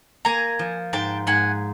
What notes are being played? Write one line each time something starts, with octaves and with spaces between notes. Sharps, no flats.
A#3 G#5 A#5
F3
G#2 G5 A5
G#2 F#5 G#5